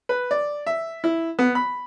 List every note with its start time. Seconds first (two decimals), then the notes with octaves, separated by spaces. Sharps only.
0.09 B4
0.31 D5
0.66 E5
1.04 E4
1.39 B3
1.55 B5